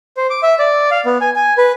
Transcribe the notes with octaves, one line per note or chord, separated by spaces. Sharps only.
C5
D6
E5
D5
F5
B3
G#5
G#5
B4